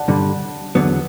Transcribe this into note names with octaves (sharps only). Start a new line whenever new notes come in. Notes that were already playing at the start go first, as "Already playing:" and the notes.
Already playing: D5 F#5 A5
G2 D3 G3
E2 D3 F#3 B3